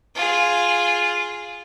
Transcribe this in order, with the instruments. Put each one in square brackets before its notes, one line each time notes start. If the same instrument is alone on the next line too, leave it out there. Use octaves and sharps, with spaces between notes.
[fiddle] F4 G#4